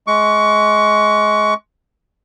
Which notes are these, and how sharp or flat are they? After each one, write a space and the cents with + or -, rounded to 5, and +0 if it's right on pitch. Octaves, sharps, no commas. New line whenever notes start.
G#3 +25 C#6 +25